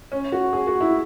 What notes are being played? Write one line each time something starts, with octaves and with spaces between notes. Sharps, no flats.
C#4
F#4
G#4
F#4
E4